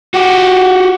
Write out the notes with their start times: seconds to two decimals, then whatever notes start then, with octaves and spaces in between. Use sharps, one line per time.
0.14 F#4 G4